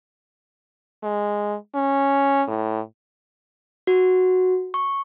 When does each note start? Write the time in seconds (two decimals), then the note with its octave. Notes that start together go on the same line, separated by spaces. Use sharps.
1.03 G#3
1.75 C#4
2.48 A2
3.87 F#4
4.74 C#6